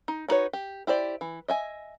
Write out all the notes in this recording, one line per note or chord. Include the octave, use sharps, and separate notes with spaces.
D#4
D4 D#4 F#4 B4 C#5
G4
E4 G4 C5 D5
E3
D#5 E5 G#5